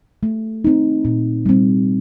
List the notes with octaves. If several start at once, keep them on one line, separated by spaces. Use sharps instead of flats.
A3
C4 D#4
A#2
G3 C4